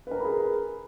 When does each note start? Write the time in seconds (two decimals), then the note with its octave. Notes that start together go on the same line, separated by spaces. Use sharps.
0.07 B4
0.11 A#4
0.16 A#5
0.20 B5
0.25 G#4